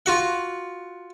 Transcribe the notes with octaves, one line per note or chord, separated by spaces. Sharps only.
F4 F#4 F#5